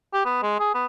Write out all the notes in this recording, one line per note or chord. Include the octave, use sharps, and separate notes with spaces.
G4
B3
G#3
G#4
B3